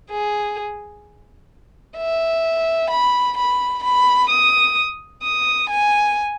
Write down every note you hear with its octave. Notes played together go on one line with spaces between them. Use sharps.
G#4
E5
B5
B5
B5
D#6
D#6
G#5